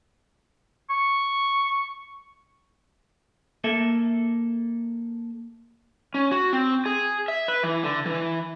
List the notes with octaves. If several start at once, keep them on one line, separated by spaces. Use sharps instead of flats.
C#6
A#3 A4 E5
C#4
F#4
C4
G#4
E5
B4
E3
D3
E3